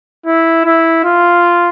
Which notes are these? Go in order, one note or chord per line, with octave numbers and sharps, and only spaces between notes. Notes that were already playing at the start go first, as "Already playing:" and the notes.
E4
E4
F4